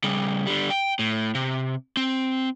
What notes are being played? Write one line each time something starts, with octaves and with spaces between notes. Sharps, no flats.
C#3 G3
D3 G3
G5
A2
C3
C4